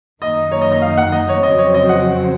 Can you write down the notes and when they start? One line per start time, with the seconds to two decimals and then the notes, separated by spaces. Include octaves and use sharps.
0.21 F#2 D#3 A#3 D#4 D#5
0.52 C#5
0.61 D#5
0.72 D#5
0.82 F5
0.98 F#5
1.12 D#5
1.29 C#5
1.43 F2 C#3 F#3 C4 D#5
1.59 C#5
1.74 D#5
1.89 F#5